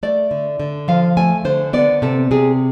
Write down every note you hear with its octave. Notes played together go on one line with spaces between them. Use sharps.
A3 D5
D3
D3
F3 F5
A3 G#5
D3 C5
B3 D5
C3 A4
C3 G#4